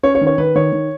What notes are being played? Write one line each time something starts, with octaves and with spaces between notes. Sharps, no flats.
C#4 C#5
C#5
D#3
C#5
D#3 B4
D#3 C#5
D#3